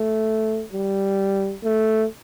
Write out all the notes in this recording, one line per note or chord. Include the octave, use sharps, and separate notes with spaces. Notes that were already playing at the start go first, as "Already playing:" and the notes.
Already playing: A3
G3
A3